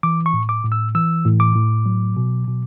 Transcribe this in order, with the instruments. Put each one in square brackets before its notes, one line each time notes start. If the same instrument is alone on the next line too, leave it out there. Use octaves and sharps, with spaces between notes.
[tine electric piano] E3 D6
C#6
A2
D6
A2
E6
E3 E6
A2
D6
A2
F#3
B2
B2